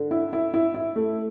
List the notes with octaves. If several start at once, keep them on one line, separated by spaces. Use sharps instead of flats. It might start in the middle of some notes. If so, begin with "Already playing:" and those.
Already playing: D3
E4
E4
E4
E4
A3